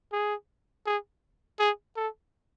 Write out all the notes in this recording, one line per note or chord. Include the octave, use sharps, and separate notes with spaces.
G#4
G#4
G#4
A4